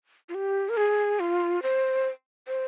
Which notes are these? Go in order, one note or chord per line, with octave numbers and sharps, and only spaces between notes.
F4
G4
A#4
G#4
F4
C5
C5